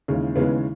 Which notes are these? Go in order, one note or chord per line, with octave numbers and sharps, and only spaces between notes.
D#2 C#3 E3 G#3
D#2 C#3 E3 G#3 B3